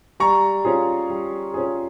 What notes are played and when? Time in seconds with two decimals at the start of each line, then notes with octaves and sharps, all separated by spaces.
0.20 G3 A#5 C#6
0.65 C#4 F4 G#4
1.10 G3
1.54 C#4 F4 G#4